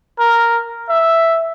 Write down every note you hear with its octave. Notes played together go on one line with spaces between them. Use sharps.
A#4
E5